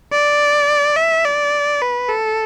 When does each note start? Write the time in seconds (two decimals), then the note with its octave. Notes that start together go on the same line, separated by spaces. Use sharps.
0.12 D5
0.96 E5
1.25 D5
1.82 B4
2.09 A4